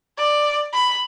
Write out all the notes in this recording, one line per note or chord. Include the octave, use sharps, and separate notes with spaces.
D5
B5